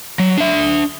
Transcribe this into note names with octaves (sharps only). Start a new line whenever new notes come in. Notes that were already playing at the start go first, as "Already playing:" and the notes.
F#3
D4 E5